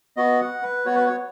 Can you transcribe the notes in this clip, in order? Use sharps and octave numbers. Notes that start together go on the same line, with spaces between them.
B3 F#4 D#5
F#5
B4
B3 F#4 C#5
B4
C#5